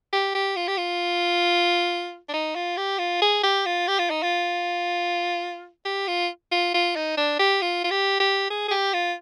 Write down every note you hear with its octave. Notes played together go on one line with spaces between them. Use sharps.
G4
G4
F4
G4
F4
D4
D#4
F4
G4
F4
G#4
G4
F4
G4
F4
D#4
F4
G4
F4
F4
F4
D#4
D4
G4
F4
F4
G4
G4
G#4
G#4
G4
F4